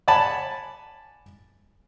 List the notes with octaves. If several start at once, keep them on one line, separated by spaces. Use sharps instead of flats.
D5 F#5 G#5 A5 B5